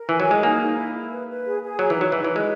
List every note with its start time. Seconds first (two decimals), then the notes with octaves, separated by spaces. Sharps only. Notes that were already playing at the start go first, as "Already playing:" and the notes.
Already playing: A#4
0.09 E3 G#5
0.20 F#3
0.26 G#3 G#4
0.43 A#3 D#4
0.60 D#4
0.77 E4
0.93 E4
1.11 B4
1.28 B4
1.45 G#4
1.61 G#4
1.79 F#3 A#5
1.90 E3
1.95 D#4
2.01 F#3
2.12 E3 B4
2.24 E3
2.30 B4
2.36 G#3